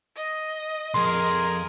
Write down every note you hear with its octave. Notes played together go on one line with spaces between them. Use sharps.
D#5
C2 F2 G#4 A#4 C6